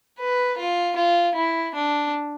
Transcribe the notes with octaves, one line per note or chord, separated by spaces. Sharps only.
B4
F4
F4
E4
D4